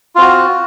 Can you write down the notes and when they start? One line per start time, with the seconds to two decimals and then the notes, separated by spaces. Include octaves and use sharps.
0.16 F4
0.18 C4
0.21 F#4